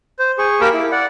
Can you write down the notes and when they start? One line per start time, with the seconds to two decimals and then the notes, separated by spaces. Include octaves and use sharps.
0.19 C5
0.38 G#4 C#6
0.61 A#3 G4 A#4 A5 B5 D6
0.74 E4
0.92 D5 F#5